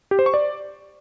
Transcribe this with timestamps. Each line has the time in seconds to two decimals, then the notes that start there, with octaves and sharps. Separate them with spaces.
0.11 G4
0.19 C5
0.26 C#6
0.34 D5